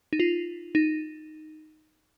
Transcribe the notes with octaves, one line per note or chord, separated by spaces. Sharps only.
D#4
F4
D#4